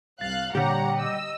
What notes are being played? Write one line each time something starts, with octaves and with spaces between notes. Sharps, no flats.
C2 F5 F#6 A6
A#2 D3 G3 G4 C#5 F#5 A#5
D#5 E6